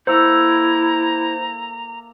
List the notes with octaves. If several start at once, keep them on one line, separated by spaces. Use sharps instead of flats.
A#3 E4 A4 C5 E5 A#5